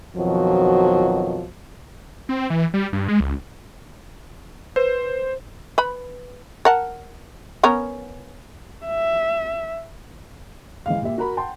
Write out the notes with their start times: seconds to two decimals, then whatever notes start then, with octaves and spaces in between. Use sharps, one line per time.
0.16 F2 B2 D#3 F3 F#3
2.29 C4
2.50 E3
2.74 G3
2.93 G2
3.08 G#3
3.20 C#2
4.76 B4 C5
5.78 B4 B5
6.65 A#4 F#5 A5
7.63 B3 C#4 A#4
8.86 E5
10.86 E3 G#3 F5
11.02 A#2 G4 E5
11.18 F#4 A#4 A#5 B5
11.37 F#5 G5 A5 C6